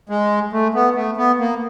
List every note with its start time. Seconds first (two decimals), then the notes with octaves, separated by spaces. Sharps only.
0.09 G#3
0.53 A3
0.74 B3
0.96 A3
1.17 B3
1.39 A#3